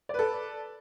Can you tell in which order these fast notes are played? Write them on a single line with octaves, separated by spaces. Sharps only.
D5 B4 A4